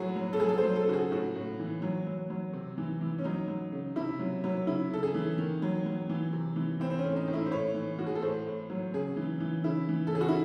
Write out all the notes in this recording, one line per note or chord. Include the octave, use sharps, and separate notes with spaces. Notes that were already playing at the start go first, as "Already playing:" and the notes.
Already playing: A2 F#3 F#4 G#4
F#3
A4
F#3 G#4
A4
C5
F#3
A4
C#3 F#4
G#4
A2 F#4
A2
E3
F#3
F#3
F#3
C3
E3
E3
C#4
F#3 D#4
F#3
C#3
C3 E4
F#3
F#3
C#3 E4
C#3 A4
G#4
E3
D#3
F#3
F#3
E3
C3
E3
E3 C4
C4
C#4
A2
D#4
A2
E4
C5
A2 C#5
E3
E3 F#4
G#4
A4
A2 C5
A2
F#3
C#3 G#4
E3
E3
C#3 E4
E3
A4
C#3 G#4
F#4
E4